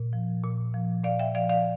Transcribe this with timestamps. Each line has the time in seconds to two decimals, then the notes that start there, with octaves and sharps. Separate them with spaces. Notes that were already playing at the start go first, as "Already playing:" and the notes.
Already playing: A#2
0.13 F3
0.44 A#2
0.74 F3
1.04 A#2 D5 F5
1.19 E5 G5
1.35 F3 D5 F5
1.49 D5 F5